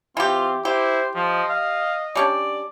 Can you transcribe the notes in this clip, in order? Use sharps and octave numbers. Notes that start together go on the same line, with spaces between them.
E3 C4 F4 G4
E4 G4 C5
F3 D#5
F5
G3 C#4 D4 D5